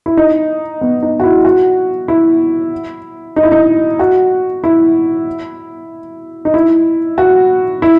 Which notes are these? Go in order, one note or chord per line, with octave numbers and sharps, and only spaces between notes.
E4
D#4
B3
D#4
F#4
E4
F#4
E4
D#4
E4
D#4
F#4
E4
D#4
E4
F#4
E4